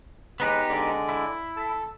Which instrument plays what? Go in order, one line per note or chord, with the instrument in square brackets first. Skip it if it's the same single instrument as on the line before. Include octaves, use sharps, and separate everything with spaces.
[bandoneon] D#2 G#3 B4 [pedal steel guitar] B3 D#4 G4
[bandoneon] D3 G#3 D5
[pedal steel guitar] E4
[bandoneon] A4 A5